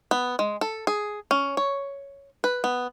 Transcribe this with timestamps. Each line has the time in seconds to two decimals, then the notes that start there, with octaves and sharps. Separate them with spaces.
0.11 B3
0.39 G#3
0.61 A4
0.87 G#4
1.31 C#4
1.57 C#5
2.44 B4
2.64 B3